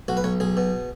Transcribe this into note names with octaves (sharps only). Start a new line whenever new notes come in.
B1 F#4
B4
B1 C#5
B1 G#4
B2